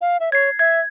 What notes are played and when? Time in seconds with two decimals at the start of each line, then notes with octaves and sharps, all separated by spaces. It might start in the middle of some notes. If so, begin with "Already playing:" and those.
0.01 F5
0.20 E5
0.32 C#5 G#6 C7
0.59 E5 G#6